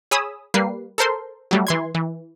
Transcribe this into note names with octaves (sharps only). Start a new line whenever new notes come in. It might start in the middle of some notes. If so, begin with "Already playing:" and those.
G#4 C#5 G#5 B5 D#6 E6
G3 A#3 B4 C7
A4 A#4 C5 C6
F#3 G3 A3
E3 C6 G#6
E3